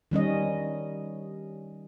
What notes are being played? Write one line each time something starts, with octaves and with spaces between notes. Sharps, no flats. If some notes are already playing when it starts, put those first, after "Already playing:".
D#3 G3 C#4 D#5